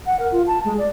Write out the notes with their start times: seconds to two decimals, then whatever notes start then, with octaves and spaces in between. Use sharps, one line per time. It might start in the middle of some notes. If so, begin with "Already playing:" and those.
0.06 F#5
0.20 A#4
0.32 F4
0.47 A5
0.65 G#3
0.78 D5